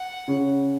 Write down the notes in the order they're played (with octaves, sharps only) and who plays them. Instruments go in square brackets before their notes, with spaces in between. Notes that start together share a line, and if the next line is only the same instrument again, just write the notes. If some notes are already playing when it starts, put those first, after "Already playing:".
Already playing: [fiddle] F#5
[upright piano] C#3 C#4